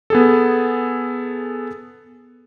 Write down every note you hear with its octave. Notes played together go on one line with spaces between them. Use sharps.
B3 G#4 A4